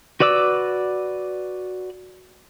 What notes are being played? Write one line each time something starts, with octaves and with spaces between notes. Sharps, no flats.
F#4 B4 D5 D6 E6